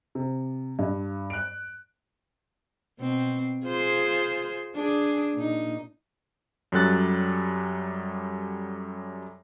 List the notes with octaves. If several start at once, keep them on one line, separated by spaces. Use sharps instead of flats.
C3
G2
F#6 D7
B2 C4
F4 G#4 C5
D4 G#4
A#2 D#4
F#2 F#3 G3 A4 F#6 A6